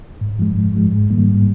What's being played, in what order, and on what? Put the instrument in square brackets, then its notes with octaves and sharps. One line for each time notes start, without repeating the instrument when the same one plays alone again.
[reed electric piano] G#2
F3 G#3
G#2
F3 G#3
G#2
D#3 G3 A#3
G#2